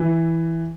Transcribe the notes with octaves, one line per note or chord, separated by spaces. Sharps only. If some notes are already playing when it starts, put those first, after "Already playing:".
Already playing: E3